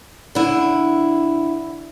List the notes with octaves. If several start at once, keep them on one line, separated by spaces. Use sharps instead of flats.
D3 E4